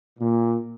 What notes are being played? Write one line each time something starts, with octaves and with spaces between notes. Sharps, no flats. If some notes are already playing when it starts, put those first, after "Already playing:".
A#2